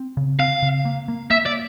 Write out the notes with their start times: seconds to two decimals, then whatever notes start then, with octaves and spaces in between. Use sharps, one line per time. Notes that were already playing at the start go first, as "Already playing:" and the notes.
Already playing: C4
0.17 C#3
0.39 C4 F5
0.62 C#3
0.85 A#3
1.08 A#3
1.30 A#3 E5
1.46 D5